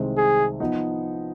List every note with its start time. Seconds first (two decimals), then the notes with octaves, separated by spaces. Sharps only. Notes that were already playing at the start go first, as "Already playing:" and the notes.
Already playing: C2 C3 D#3 G#3 C4
0.17 G#4
0.60 F3 B3 D#4